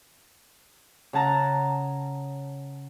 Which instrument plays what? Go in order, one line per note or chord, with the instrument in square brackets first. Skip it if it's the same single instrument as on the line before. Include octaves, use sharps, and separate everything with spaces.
[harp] C#3 F#5 A5 A#5